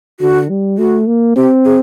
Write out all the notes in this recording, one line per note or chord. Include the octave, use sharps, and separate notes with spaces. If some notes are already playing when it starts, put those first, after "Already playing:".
D3 F#4
G3
A3 F#4
A#3
C4 G4
G#4